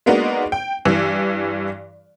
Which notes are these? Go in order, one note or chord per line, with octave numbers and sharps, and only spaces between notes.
G#3 A#3 B3 D4 D#4 F#4
G5
G2 E3